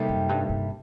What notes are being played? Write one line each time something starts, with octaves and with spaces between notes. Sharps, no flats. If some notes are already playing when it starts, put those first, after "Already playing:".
Already playing: C3 G3 A#3 D#4 A4
F#2
G2
G2